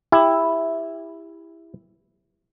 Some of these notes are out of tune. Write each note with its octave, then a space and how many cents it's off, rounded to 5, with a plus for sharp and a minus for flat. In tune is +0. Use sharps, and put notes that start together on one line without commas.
E4 +0 G4 +25